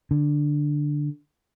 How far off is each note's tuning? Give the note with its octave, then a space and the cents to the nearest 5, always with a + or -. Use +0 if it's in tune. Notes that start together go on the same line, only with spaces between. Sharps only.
D3 +5